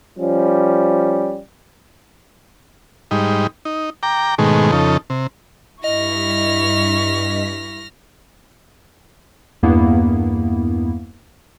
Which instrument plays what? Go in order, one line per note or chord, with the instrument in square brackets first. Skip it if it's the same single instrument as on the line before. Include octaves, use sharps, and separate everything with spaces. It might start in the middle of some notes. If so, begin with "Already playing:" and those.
[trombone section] F3 G3 C#4
[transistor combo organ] G#2 G3 D#4
D#4
G5 A#5 D6
G#2 B2 D#3 G#3 A3
F2 C#3 D#4 A4
C3
[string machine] G2 B6 [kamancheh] E4 C#6 [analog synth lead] D#5 [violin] F6 A#6
[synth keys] E2 G2 A#3 B3 E4